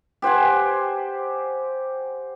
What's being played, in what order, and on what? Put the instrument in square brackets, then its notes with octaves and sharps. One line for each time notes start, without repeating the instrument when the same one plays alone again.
[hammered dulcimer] G4 C5 F#5 G#5